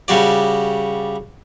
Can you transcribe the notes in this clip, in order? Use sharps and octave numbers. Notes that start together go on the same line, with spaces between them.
C#3 G3 F#4 D5